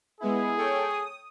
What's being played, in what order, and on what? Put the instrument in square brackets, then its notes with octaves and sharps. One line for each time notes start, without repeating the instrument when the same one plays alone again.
[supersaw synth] G#3 B3 E4 [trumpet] G#4
[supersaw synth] A4 C#5 G5
D#6